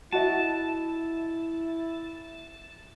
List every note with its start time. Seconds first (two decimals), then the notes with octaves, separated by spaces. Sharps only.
0.12 E4 F#4 D#5 E5 A5